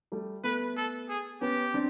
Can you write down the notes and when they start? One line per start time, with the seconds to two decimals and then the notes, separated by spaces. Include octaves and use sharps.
0.12 G3 A3
0.44 A3 B3 B4
0.77 A4
1.09 G#4
1.41 B3 C#4 G4
1.74 C4 D4